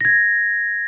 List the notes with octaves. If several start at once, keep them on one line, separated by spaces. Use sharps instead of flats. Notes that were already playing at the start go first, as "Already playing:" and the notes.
G#6 A#6